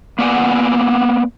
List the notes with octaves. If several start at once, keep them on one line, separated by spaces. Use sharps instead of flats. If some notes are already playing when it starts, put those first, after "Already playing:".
A#3 B3 D5 F#5 G#5